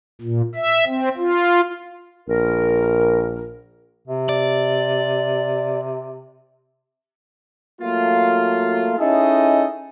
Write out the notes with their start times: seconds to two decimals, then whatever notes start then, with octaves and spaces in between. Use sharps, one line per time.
0.21 A#2
0.55 E5
0.86 C4
1.17 F4
2.29 A#1 A#4
4.08 C3
4.29 D5
7.81 F#3 A3 A#3 F4
8.99 C#4 D#4 E4 G#4 A4 D#5